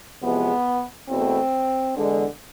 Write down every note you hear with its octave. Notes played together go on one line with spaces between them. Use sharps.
E2 C3 F3 G#3 B3
E2 B2 A3 C4
E2 D3 G#3